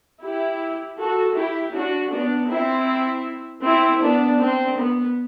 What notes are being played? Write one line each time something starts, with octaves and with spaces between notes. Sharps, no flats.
E4 G4
F#4 A4
E4 G4
D4 F#4
B3 D4
C4 E4
C4 E4
B3 D4
C4
B3